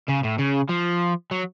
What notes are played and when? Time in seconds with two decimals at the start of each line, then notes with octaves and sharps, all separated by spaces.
0.08 C#3
0.23 A2
0.38 C#3
0.69 F3
1.31 F#3